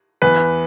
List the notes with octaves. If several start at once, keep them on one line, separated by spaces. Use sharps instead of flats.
E2 B4